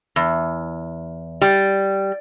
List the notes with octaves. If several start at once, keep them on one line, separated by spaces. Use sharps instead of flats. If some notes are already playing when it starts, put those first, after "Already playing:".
E2
G3